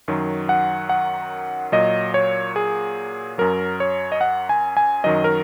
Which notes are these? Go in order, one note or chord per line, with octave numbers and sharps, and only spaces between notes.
F#2 D#3 F#3
F#5
F#5
A#2 F#3 D#5
C#5
G#4
F#2 F#3 A#4
C#5
D#5
F#5
G#5
G#5
F#2 D#3 F#3 D#5
A#4